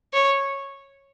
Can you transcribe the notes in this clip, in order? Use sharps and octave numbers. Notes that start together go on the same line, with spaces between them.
C#5